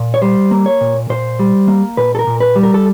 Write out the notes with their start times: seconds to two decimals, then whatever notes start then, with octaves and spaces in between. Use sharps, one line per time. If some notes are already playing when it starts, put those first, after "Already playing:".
Already playing: A#2
0.14 C#5
0.22 G3 C5
0.51 A#3
0.66 C#5
0.81 A#2
1.09 A#2 C5
1.39 G3
1.68 A#3
1.97 A#2 B4
2.15 A4
2.19 A#4
2.27 A#2
2.40 B4
2.56 G3
2.63 A#4
2.74 A4